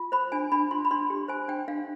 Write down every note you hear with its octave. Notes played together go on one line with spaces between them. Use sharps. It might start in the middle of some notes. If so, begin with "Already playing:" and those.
Already playing: F4
C5 B5
D4 G#5
D4 B5
F4 C6
B5
D4 C6
G4
C5 G#5
D4 G5
D4 F5